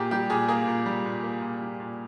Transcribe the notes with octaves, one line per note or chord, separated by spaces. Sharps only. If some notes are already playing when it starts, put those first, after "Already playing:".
Already playing: A#2 A#3 G4 G#4
G3 G4
A#2 G#4
A#3 G#4
A#2
G3
A#2
A#3
A#2
G3
A#2